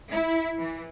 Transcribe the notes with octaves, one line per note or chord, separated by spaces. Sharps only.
E4
E3